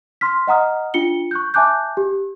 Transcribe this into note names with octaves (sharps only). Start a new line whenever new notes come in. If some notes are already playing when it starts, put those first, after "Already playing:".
C6 F6 B6
D#5 F#5 A#5 D#6 F6
D4 F4 C#7 G7
C#6 F#6 G6
E5 G#5 A5 D6 F#6 G6
G4